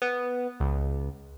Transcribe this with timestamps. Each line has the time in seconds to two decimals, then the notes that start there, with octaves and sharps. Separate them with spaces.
0.02 B3
0.60 C#2